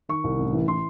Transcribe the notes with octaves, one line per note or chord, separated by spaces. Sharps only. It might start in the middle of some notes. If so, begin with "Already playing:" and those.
D#3 C#6
C2
A1
E3
E3 C6